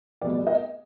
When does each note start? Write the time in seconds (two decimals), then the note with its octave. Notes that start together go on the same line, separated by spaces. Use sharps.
0.21 F1 E2 B2 G3 B3 D5
0.47 D#5